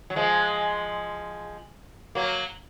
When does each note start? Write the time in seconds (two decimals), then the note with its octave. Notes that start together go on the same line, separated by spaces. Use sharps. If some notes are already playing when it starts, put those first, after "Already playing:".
0.10 F#3
0.16 F3 G#3
2.15 F#3 A#3